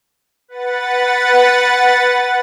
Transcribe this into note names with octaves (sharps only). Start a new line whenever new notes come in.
B4 F#5 A6